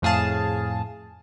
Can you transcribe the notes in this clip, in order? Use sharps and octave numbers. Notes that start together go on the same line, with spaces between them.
F2 A2 G#4 F5 A5